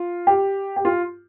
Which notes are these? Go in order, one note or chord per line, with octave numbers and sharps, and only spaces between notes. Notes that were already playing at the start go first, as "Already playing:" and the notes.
Already playing: F4
G4
G4
F4